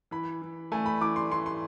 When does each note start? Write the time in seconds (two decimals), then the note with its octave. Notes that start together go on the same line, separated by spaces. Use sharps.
0.11 E3 B5
0.42 E3
0.72 A3 G#5
0.86 B5
1.01 E3 D6
1.16 C6
1.31 E3 C6
1.46 C6